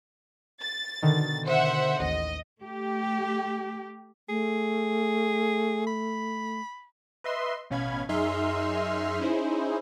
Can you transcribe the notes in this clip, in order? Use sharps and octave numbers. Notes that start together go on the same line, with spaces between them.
A6
B2 D3 D#3
C5 E5 F#5
A1 D#2 D#5
A3 G4
A3 G#4
B5
B4 D#5 E5 C6
A1 B2 C#4 F5 B5 G#6
F#2 D#4 G#4 E5 C6 F6
C#4 D#4 E4 G#4 C5